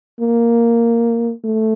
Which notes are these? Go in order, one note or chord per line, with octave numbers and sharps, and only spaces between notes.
A#3
A3